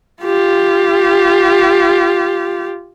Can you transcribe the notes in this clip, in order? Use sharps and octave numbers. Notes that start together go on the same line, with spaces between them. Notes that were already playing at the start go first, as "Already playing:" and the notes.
F4 G4